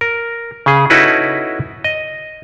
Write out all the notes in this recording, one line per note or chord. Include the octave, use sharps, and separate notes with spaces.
A#4
C#3 G#4
C#4 D#4 E4 F#4 A4 B4
D#5